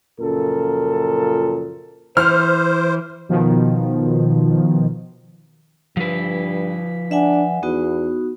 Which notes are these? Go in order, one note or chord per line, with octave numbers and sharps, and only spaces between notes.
F#2 A#2 C#3 F3 A4 A#4
E3 C5 F6
B2 D#3 F3
G2 F3 B4
D4 E5 F#5 G#5
E2 B3 D#4 F#4